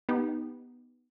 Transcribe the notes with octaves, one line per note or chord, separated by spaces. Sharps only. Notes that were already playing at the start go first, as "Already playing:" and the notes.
B3 D#4 G4